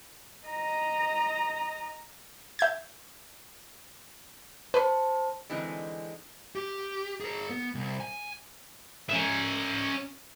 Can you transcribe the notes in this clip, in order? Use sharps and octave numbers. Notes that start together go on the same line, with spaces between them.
D#5 A#5
E5 G6 G#6
B4 C5 A5 B5
D3 E3 G#3 C4 D#4
G4
G#4 A#4
B3
C2
G#5
C#4 E5